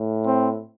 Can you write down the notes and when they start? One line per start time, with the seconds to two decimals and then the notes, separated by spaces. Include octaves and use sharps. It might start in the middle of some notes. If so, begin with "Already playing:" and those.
Already playing: A2
0.26 C4